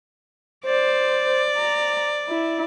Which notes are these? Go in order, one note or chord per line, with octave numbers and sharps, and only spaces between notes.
C5 D5
A#5
E4